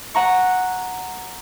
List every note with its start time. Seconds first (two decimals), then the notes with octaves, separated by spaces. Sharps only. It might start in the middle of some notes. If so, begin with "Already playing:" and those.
0.14 F#5 A#5 C#6